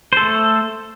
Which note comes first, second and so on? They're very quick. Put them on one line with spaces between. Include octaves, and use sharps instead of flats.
C5 A4 A3